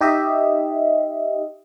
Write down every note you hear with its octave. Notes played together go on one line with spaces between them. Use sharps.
D#4 G4 D#5 E5